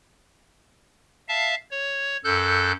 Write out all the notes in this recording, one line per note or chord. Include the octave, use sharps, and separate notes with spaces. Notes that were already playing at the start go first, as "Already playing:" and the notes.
E5 F5 A5
C#5
F#2 A4 F#6 G6